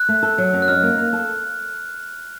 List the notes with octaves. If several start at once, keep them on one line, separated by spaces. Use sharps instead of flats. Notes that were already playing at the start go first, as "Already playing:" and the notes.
Already playing: F#6
A3
A4
F#3
F#2
F#6
D#4 F6
A#3
A#3
A4